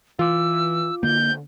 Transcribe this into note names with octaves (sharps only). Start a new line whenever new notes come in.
E3 F4 D6 E6
D3 A#3 G6